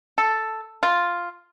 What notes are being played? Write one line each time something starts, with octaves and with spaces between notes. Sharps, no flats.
A4
F4